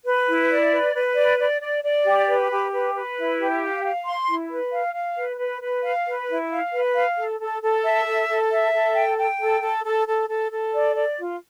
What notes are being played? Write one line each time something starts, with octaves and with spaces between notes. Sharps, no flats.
B4
E4
D5
B4
B4
D5
D5
D5
D5
G4
B4
G4
B4
B4
E4
G4
F5
F5
C6
E4
B4
F5
F5
B4
B4
B4
F5
B4
E4
F5
B4
F5
A4
A4
A4
E5
A4
A4
E5
A4
G5
G5
A4
A4
A4
A4
A4
A4
D5
D5
F4